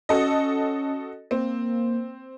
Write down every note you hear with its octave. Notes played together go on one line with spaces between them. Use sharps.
C#4 F#4 A4 D#5
A#3 C4